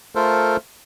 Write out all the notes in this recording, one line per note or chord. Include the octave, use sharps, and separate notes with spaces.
A3 F4 A4 A#4 C5